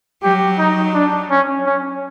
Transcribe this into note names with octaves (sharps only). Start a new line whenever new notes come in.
F#3 G4
D#4
D4
C#4
C#4